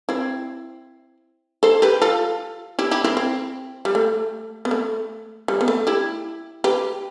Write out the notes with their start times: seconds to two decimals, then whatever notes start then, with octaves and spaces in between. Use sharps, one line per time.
0.09 C4 E4
1.63 A4 C5
1.82 G4 B4
2.02 F4 A4
2.79 E4 G4
2.91 E4 G4
3.04 C4 E4
3.17 C4
3.85 G3
3.95 A3
4.65 B3
4.71 A3
5.48 G3
5.61 B3
5.68 A3
5.87 E4 G4
6.64 G4 B4